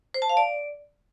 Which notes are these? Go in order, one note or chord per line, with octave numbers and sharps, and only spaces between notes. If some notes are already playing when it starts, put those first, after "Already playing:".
C5
A5
F5
D5